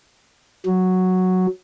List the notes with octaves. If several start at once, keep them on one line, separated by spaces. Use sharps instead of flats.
F#3